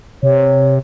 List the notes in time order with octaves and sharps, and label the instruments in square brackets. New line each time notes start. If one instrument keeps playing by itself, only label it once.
[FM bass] C3 [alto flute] C#5